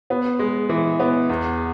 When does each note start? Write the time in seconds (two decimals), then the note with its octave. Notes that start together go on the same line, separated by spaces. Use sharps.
0.10 B3
0.39 G#3
0.69 E3
1.00 B3
1.29 E2